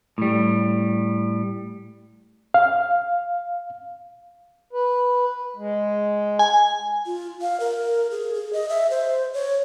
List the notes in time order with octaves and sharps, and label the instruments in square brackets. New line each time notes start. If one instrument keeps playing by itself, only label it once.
[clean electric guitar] A2 G3
[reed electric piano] F5
[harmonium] B4
G#3
[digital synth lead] G#5
[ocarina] F4
F5
A#4
G#4
G#4
D#5
E5
C5
C#5